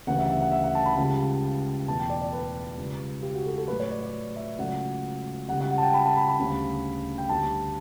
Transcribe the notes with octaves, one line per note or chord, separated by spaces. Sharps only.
D2 C#3 E3 G3 F#5
E5
E5
F#5
E5
F#5
A5
B5
C#2 C#3 G3 A5
E2 B2 A3 A5
G5
D5
D5
B4
C#2 C#3 G3
G4
F#4
A4
A4
A2 F#3 A3 B4
C#5
D5
D5
E5
C#2 C#3 F#3 A3 F#5
C#2 C#3 G3 F#5
F#5
F#5
A5
G5
B5
A5
B5
B5
D2 C#3 G3
G5
D2 D3 G3 A5